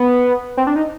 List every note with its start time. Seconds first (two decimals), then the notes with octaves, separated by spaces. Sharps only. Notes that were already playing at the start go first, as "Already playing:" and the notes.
Already playing: B3
0.57 C4
0.67 D4
0.76 D#4